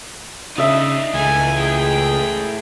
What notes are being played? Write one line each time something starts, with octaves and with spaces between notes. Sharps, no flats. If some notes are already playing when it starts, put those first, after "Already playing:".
C#3 D4 D#4 D#5 E5
C#2 E3 A3 G#5
G#4 G5